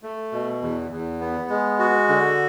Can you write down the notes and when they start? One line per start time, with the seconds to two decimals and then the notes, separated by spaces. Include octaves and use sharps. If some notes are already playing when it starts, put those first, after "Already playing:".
0.03 A3
0.32 B2
0.62 E2
0.91 E2
1.21 B3
1.49 G#3
1.79 F#4
2.09 D3